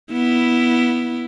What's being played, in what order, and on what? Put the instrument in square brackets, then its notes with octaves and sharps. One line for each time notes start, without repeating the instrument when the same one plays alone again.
[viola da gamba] B3 E4